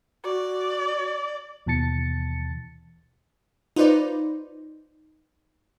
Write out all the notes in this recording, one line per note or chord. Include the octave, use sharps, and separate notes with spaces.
F#4 D5
D#2 B2 E3 A5 A6 C#7
D#4 F4 B4 C5 D5